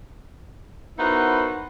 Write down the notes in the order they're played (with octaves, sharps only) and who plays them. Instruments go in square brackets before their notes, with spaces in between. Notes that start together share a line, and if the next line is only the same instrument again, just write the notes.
[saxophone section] B3 D#4 E4 F#4 A#4 C5